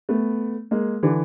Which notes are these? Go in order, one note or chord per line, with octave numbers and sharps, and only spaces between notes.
A3 B3
G#3 A#3
D3 E3